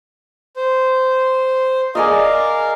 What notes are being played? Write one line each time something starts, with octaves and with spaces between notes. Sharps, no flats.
C5
G#4 A#4 D5 D#5 F5